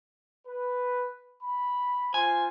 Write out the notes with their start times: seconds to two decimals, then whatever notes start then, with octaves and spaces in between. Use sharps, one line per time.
0.47 B4
1.43 B5
2.14 F4 C5 G#5